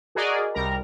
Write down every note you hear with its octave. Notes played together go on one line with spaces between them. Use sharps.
F#4 G#4 A#4 D5 D#5
C2 G3 A#4 A#5